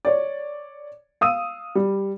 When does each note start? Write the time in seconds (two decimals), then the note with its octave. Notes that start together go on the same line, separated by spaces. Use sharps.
0.05 C#5 D5
1.21 F5 D#6 E6 D#7
1.75 G3